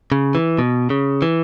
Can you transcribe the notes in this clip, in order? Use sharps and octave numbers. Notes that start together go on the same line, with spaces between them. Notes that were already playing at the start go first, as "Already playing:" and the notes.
C#3
E3
B2
C#3
E3